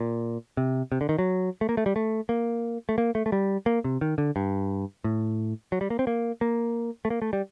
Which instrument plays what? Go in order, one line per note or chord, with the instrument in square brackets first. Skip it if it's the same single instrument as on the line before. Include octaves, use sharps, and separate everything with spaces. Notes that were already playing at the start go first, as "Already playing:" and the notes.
Already playing: [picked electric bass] A#2
C3
C3
D3
D#3
F#3
A3
A#3
A3
G3
A3
A#3
A3
A#3
A3
A3
G3
A#3
C3
D#3
D3
G2
A2
F#3
G3
A#3
C4
A#3
A#3
A3
A#3
A3
G3